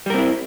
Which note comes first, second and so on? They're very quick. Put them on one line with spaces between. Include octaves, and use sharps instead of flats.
G3 A#4 C4 E4